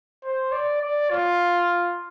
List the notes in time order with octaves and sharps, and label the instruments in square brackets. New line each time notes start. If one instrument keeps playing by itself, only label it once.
[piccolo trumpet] C5
D5
D5
F4